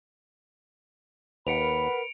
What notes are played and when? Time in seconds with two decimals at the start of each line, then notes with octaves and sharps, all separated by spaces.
1.47 D#2 A#4 B4 F#5 B5 C#7 D7 F7